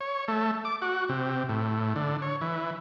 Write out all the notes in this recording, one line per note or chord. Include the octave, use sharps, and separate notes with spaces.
C#5
A3
D6
F#4
C3
A2
D3
C#5
E3